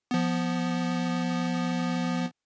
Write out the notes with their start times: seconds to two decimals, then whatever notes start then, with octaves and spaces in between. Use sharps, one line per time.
0.11 F3 B3